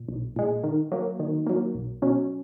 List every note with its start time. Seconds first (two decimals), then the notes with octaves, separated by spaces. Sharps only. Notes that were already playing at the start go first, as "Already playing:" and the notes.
Already playing: A#2
0.08 B1
0.36 A#2 G#3
0.64 D#3
0.92 F#3 A#3
1.19 D#3
1.47 F#3 A#3
1.75 B1
2.02 B2 F#3 C#4